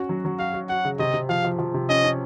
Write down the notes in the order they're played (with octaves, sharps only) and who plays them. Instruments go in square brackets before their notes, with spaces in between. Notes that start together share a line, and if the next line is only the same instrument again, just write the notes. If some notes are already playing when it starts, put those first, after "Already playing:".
Already playing: [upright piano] C#4 F#4
F#3
F#3
[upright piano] F#4 [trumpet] F5
[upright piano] F#4
[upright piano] F#4 [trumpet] F#5
[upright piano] C#3
[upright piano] C3 [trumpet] D#5
[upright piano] C3
[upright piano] F3 [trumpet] F5
[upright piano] F3
F3
C3
[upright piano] C#4 [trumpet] D#5
[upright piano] C#4